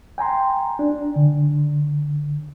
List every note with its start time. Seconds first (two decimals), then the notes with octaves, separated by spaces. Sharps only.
0.18 G5 G#5 A#5 C6
0.79 D4
1.16 D3